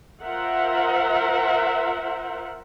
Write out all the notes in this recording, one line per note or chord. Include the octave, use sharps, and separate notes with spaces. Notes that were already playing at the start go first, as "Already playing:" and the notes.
F4 A#4 C5 E5 F#5